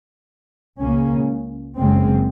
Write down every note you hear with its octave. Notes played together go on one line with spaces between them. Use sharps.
C#2 C#3 A#3 C#4
F#1 F#2 C#3 G#3 C4